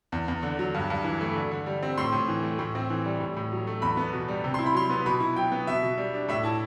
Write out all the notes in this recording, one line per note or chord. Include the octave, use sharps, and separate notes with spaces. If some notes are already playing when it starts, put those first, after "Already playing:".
E2
E2
D3
F#3
G2
G2
E3
A3
D3
D3
G3
C4
A2 C6
A2
E3
A3
A2
C4
E3
G3
A2
A2
F#3
A3
E2 B5
B3
B2
G3
C3
E4 C6
B5
F#3 C6
B3
B2 B5
E4
F#3 G5
B3
B2 E5
B2
G3
D4
A2 E5
E4 A5